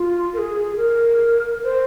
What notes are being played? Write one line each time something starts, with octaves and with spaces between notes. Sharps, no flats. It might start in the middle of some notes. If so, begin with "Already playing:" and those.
Already playing: F4
A#4
G#4
A#4
C5